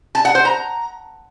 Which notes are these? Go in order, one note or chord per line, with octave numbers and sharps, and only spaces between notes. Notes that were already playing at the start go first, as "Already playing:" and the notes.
A5
F#5
C5
A#5